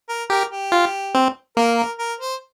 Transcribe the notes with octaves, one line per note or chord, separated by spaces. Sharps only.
A#4
G4 A#4
G4
F4
C4
A#3 A#4
A#4
A#4
C5